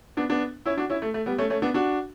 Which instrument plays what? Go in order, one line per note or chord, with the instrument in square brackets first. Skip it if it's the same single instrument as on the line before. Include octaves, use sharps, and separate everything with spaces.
[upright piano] B3 D4
B3 D4
C#4 E4
D4 F#4
C#4 E4
A3
A3
G3 B3
A3 C#4
A3 C#4
B3 D4
D4 F#4